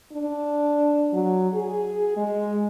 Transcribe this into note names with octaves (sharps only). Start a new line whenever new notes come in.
D4
F#3
G#4
G#3